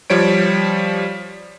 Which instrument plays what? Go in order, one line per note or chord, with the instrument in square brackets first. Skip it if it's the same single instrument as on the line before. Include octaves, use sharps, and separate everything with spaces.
[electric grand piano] F3 G3 C#5 D7